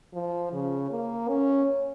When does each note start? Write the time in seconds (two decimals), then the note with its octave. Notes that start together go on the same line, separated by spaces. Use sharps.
0.14 F3
0.53 C#3
0.91 A#3
1.29 C#4